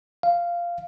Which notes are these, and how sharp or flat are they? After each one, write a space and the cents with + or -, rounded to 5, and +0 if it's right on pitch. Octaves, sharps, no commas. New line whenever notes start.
F5 -10